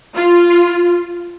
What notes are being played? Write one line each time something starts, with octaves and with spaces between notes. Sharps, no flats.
F4